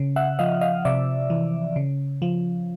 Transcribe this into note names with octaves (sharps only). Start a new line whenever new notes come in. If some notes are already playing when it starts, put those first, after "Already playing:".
Already playing: C#3
E5 F#5
F3 D#5 F5
D#5 F5
C3 D5 E5
E3
C#3
F3